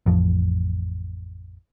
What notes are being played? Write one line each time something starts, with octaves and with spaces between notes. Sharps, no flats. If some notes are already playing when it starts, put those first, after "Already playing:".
A1 F2 F3